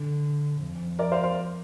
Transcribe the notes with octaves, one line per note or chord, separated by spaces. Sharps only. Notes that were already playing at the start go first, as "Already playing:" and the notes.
Already playing: D3
F2
A#4 D5
C5 F5
C5 F5